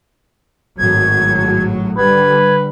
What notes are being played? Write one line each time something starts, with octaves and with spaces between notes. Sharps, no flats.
G#1 A2 F#3 G#6
D3 G3 B4 G#6